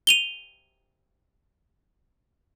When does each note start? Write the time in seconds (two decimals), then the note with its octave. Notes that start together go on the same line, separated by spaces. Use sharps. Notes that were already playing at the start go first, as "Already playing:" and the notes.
0.07 D#7 F7 G7